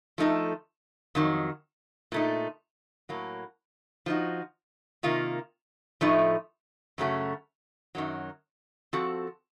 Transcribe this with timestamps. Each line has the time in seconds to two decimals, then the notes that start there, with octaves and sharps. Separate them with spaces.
0.18 F3 A3 D#4 A4
1.15 F2 D#3 F#3
2.12 A#2 A3 D#4
3.09 A2 F#3 A#3
4.06 F3 A3 D#4 F#4
5.03 C3 D#3 A#3 F4
6.01 A2 F3 A3 D#4
6.98 F#2 C#3 A3 C#4 F#4
7.95 F#2 D#3 F#3
8.93 F3 C4 F#4 A4